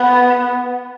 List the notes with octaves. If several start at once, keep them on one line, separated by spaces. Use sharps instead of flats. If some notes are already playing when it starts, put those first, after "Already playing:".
Already playing: B3